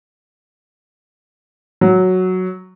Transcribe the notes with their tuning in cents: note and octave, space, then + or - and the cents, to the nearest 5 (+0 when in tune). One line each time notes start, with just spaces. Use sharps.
F#3 +0